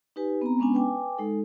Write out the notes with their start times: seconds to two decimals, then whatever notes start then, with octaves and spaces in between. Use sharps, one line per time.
0.16 D#4 G4 B4 G#5
0.42 B3 C4 A#5
0.59 G#3 B3 C#4 D4 G#5
0.73 B4 G5 G#5 D6
1.18 G#3 D#4 A4